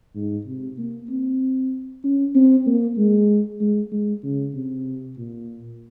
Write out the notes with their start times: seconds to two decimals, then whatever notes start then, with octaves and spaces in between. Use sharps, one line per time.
0.15 G#2
0.46 C3
0.78 A#3
1.10 C4
2.04 C#4
2.35 C4
2.66 A#3
2.98 G#3
3.61 G#3
3.92 G#3
4.23 C#3
4.54 C3
5.18 A#2